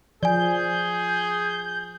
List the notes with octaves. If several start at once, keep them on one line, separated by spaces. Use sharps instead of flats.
F3 G#4 D5 G#5 G6